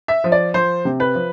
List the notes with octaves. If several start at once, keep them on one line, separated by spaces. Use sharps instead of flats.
E5
F3
D5
F3 C5
C3
B4
F3